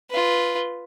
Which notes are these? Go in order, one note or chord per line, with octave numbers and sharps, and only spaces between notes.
F4 B4